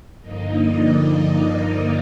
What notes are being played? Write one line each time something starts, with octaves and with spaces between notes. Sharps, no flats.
G2 D3 F3 A#3 D#4 D#5
D5
D#5
A#4